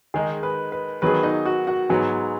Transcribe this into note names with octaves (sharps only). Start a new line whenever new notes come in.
D#3 G#3 D#4 G#4
B4
B4
D#3 F#3 B3 G#4 B4
D#4 D#5
F#4 F#5
F#4 F#5
G#2 F#3 B3 G#4 G#5